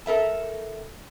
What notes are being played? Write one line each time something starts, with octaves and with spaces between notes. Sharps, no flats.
A4 A#4 E5 A5